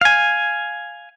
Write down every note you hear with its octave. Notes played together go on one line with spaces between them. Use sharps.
F5 G#5